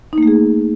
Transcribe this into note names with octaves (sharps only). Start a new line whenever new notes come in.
A3 A#3 D#4 G#4